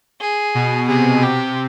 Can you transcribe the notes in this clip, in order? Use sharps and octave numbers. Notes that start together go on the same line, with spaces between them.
G#4
B2
C3 G#4
C3 G4